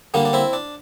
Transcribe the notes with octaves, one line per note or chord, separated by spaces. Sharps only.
D3 G3 A#3 D4
D4
C4 E4
D4